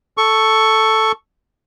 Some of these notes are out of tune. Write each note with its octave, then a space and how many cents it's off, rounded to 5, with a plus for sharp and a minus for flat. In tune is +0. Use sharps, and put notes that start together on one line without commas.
A4 +0 C#6 +0